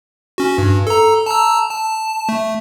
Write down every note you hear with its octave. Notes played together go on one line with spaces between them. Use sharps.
C#4 F#4
G2
A4 A#5
A5 A#5 E6
A5
A3